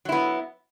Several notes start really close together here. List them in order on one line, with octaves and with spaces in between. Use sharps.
F#3 E4 B3